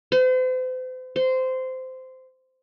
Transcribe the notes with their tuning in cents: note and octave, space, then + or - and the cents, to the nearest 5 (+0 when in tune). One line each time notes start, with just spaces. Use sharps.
C5 -40
C5 -15